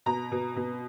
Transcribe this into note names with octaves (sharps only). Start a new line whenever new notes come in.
B2 A#5
B2
B2